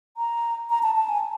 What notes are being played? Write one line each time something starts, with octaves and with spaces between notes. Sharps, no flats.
A#5
A#5
A5
A5
G#5